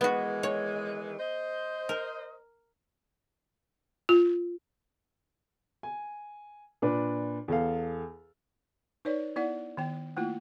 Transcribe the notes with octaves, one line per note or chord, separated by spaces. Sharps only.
D#3 E3 G#3 B3 F#4
C#5
C5 D#5
A#4
F4
G#5
A#2 D4 B4
E2 A4 F5
D#4 B4 C#5 D5
B3 E4 D5 F#5
D#3 B3 G5
A3 A#3 E4 F4